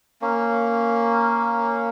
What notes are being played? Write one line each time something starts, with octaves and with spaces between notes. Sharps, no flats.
A#3 C#4